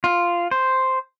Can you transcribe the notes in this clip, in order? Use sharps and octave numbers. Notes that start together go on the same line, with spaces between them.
F4
C5